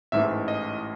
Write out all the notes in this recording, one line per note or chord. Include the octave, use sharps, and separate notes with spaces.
A1 G#2 E3 A3 E5
D#5